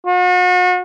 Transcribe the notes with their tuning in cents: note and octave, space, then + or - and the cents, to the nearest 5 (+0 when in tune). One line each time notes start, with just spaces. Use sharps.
F#4 -40